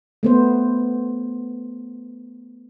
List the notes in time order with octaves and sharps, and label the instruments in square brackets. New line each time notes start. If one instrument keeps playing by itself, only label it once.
[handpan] A3 B3 C5